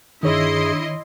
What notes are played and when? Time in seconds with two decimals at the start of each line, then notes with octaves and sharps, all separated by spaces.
0.23 G2 D#3 E4 G#4 C#5 D#5 C6